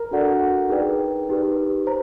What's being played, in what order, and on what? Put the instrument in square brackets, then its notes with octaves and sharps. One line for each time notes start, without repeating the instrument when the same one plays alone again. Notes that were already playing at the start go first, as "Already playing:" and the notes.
Already playing: [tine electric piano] A#4
[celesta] D4 F#4 A4 D5 F#5
D#4 G#4 B4 D5 G5
D#4 G4 B4
C5 A#5